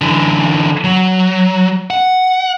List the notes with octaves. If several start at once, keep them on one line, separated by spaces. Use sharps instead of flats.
D3 E3
F#3
F#5